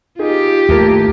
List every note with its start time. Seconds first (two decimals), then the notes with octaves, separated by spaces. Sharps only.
0.19 D#4 F4 G4 G#4
0.69 D#2 A2 A#4